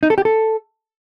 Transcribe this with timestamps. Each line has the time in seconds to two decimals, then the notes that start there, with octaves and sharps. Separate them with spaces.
0.03 D#4
0.10 A4
0.18 G4
0.25 A4